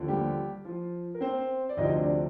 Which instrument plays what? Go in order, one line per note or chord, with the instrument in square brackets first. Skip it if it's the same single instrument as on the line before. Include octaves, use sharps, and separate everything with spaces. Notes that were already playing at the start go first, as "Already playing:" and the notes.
Already playing: [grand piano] D#2 D3 F3
G3 G4
F3 F4
A#4
C4 C5
D5
D2 C3 F3 D#4 D#5
D4 D5